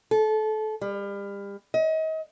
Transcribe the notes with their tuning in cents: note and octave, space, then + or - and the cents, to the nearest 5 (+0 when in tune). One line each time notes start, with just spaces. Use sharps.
A4 -25
G3 +35
D#5 +35